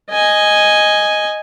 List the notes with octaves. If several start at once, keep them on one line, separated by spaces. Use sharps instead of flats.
D#5 G#5